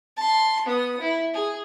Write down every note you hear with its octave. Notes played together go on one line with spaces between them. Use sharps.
A5 C6
B3 D#6
E4
G#4